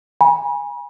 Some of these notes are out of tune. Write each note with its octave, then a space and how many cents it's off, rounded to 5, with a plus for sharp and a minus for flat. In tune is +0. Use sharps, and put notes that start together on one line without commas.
G#5 -20 B5 -40